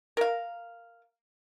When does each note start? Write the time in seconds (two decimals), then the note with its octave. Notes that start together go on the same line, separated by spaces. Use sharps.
0.17 A#4 F5